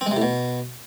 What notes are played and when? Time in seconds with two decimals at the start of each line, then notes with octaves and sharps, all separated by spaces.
0.01 C4
0.06 G#3
0.11 C3
0.16 A2
0.22 B2